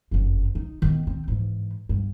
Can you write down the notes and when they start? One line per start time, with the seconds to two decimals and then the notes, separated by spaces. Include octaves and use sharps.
0.11 F#1 F2
0.55 D#4
0.82 D#3 B3
1.07 C4
1.28 G#2 E3
1.89 G2